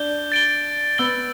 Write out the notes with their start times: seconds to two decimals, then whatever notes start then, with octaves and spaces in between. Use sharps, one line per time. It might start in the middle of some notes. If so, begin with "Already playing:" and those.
Already playing: D4 G6 G7
0.32 A6 D7 G7
0.98 B3 E6 A6 G7